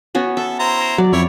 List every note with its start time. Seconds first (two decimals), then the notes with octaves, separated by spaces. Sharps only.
0.15 B3 C#4 F#4
0.37 A4 E5
0.60 E4 C5 A#5
0.98 F#3 D5
1.13 F2 E4 C#5